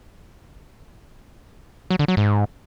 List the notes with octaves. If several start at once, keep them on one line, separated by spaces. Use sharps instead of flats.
F#3
D3
F#3
G#2